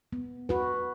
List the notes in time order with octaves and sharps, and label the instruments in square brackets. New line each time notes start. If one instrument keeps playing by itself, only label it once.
[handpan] B3
F#4 B4